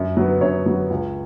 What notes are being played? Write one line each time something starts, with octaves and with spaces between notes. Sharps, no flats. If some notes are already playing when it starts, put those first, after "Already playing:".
Already playing: F#2
F#3 B3
F#2 C#5
F#3 B3
C#2